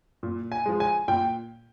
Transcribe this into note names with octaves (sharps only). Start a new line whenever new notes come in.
A#2
G#5
F3 G#3
G#5
A#2 G5